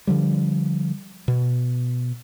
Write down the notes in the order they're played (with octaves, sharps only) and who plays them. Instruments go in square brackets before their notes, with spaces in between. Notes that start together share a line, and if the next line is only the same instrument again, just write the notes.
[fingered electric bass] D3 F3 G3
B2